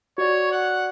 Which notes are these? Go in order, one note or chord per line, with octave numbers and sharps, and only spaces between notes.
F#4 C#5 D5
F#5